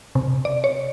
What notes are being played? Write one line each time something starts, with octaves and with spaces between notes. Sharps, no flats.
C3
D5
C#5